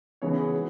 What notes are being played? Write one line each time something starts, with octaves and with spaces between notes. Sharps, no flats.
C#3 E3 G#3 B3 C#5
G#4
F#4